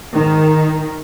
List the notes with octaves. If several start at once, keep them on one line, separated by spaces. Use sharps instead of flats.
G#2 D#3